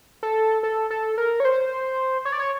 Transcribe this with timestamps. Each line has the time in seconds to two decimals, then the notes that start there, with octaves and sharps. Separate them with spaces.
0.23 A4
0.63 A4
0.90 A4
1.18 A#4
1.40 C#5
1.45 C5
2.25 C#5
2.32 D5
2.40 C#5